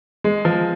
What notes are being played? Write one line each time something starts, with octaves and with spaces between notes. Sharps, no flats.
G#3
F3